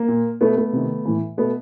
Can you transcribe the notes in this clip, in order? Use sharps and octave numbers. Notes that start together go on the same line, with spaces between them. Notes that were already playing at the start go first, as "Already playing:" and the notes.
Already playing: A#3
A#2
B2 A3 B3
A3 B3
C3 D#3
A2 E3
B2 A3 B3